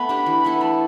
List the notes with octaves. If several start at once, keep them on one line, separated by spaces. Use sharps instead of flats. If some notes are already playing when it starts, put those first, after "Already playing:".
Already playing: A3 B3 B4 B5
D4 G4
E3
B3 E4 A4
A3 A5